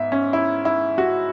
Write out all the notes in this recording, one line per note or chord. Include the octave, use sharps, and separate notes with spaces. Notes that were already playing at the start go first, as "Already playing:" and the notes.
Already playing: G#2 B3 E5
C#4
E4
E4
F#4